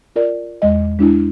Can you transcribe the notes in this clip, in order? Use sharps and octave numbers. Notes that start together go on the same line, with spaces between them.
F4 A#4 D5
E2 G#3 D#5
G#3 D4 E4